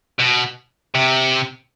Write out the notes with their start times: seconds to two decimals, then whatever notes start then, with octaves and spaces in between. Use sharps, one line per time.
0.19 B2
0.95 C3